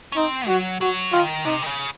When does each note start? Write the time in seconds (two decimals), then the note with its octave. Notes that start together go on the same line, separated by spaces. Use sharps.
0.12 C#4
0.16 C4 D#4
0.48 F#3 F#4
0.81 F#3 F#4
1.12 D#3 F4
1.45 C3 D#4
1.62 D#3
1.66 C#3